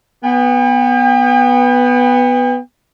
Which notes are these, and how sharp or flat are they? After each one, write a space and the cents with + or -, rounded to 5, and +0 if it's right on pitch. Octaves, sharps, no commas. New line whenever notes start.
B3 +0 G5 +40